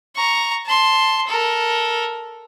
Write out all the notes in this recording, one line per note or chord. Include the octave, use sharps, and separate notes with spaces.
A#5 C#6
A5 C6
A4 A#4